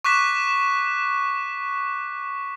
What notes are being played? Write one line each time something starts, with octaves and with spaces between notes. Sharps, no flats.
C#6 D6 F#6 B6 E7